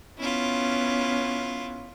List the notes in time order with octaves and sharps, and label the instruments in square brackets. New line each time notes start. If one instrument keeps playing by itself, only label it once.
[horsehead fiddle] B3 C#4 [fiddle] E4 F4